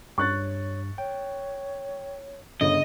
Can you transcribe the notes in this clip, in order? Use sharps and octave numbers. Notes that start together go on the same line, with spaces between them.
G2 C#5 C#6 F#6 A6
C#5 G5
G1 C#3 C#5 D#5